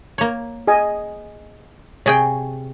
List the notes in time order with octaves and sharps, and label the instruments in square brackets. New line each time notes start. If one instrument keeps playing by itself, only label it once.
[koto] A#3 C#5
[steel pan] G#4 D#5 G#5
[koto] C3 G#4 G5 [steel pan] C#5